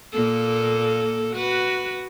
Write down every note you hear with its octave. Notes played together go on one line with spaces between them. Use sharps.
A#2 A#3 A4
F#4 B4